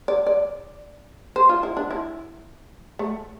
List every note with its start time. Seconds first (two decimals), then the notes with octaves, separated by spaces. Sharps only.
0.08 D5
0.27 D5
1.36 C5
1.49 F4
1.63 E4
1.77 D4
1.91 E4
2.99 A3